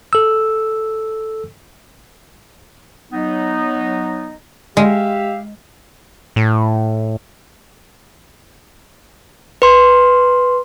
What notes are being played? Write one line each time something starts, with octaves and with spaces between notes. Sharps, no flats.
A4 E6
F#3 B3 D#4
G#3 G4 E5 F5
A2
B4 C6